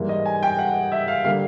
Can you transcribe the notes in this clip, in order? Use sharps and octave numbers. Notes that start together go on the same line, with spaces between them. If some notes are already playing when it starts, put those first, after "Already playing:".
Already playing: G#2 E3 G3 A#3
D#5
G#5
G5
F#5
E5
F5
D3 G3 A#3 F5